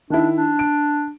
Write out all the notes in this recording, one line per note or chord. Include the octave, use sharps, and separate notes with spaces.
D#3 D4 E4
D4
D7